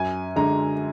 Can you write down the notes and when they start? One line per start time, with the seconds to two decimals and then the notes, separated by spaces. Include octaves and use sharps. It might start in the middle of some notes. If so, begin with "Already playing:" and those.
Already playing: F#2 G#5
0.36 D3 G#3 A#5